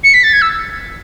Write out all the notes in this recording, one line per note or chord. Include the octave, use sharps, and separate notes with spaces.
C#7
B6
A6
G#6
E6